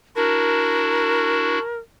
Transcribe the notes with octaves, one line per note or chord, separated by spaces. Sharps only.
D4 E4 F#4 A#4